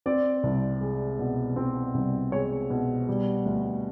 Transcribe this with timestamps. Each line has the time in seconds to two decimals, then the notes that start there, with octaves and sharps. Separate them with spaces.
0.06 C4 D5
0.43 C2
0.81 G#3
1.19 B2
1.56 C4
1.94 C2
2.32 G#3 C#5
2.70 B2
3.08 G3
3.46 D2